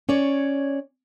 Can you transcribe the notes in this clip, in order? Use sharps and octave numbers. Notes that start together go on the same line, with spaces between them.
C#4 C#5 D5